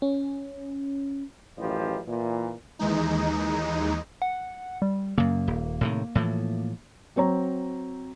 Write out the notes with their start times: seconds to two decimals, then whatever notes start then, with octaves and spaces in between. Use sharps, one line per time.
0.02 C#4
1.58 A1 F#2 F3 G4 B4 D#5
2.07 A#2 E3
2.79 D#2 E3 G#3 D#4
4.22 F#5
4.82 G3
5.18 F#2 C#3 A#3
5.47 D#1
5.81 A2 C3 D#3
6.15 A2 E3 F3
7.16 F#3 C4 C#5 A#5